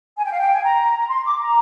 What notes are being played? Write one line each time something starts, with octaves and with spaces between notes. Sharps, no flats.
G#5
G5
F5
G5
G#5
A#5
A#5
C6
D6
A#5